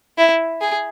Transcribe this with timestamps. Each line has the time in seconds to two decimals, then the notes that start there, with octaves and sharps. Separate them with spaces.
0.18 E4
0.61 G#4